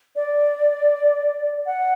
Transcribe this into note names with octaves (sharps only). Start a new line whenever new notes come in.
D5
F#5